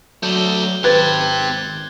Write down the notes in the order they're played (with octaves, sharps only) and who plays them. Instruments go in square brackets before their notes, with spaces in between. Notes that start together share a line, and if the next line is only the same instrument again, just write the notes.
[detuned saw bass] F#3 [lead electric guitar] A3 D4 [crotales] G6 G7
[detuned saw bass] G#1 [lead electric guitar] C4 G4 [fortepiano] B4 [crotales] F#6 G#6 A6